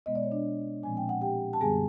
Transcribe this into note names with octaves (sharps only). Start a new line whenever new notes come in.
B2 G#3 B3 D#5
D5
C#5
D4 D5
A#2 F3 G#3 C4 G#5
G5
F#5
G4 G5
A5
F#2 D3 G3 B3 G#4 G#5